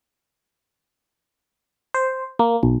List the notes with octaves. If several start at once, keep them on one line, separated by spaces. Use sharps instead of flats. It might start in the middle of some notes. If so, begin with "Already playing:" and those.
C5
A#3
B1